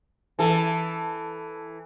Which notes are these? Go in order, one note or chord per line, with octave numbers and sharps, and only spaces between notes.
E3 A4